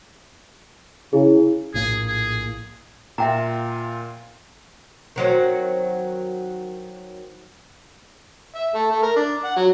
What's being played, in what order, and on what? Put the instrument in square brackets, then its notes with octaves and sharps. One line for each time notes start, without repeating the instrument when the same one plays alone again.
[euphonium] C#3 [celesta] E4 G#4
[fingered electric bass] A#1 A2 A#3 [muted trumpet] G#4
[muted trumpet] G#4
[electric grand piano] A#2 F4 [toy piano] E5 G5 A#5
[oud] D#3 F#3 C4
[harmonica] E5
A3
A3
A#4
D4
F#5
F#3